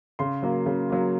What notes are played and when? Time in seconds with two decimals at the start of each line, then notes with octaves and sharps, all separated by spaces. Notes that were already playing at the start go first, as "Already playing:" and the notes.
0.19 C#3 C6
0.42 F#3 A#3
0.66 C#3
0.90 F#3 A#3